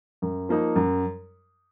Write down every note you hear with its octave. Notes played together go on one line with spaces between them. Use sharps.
F#2
F3 A#3 D#4
F#2